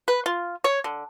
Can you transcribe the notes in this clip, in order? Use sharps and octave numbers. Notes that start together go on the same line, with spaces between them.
B4
F4
C#5
D3